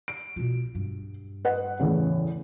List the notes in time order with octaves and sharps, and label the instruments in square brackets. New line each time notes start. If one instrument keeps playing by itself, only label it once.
[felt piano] D7
[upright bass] B2 F4
G2
[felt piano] B4 D#5 F#5
E2 A2 C#3